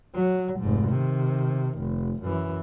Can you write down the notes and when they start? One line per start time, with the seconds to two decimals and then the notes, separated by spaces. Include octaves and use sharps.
0.15 F#3
0.60 F1 G#2
0.89 C3 D#3
1.79 F1
2.23 F#2 E3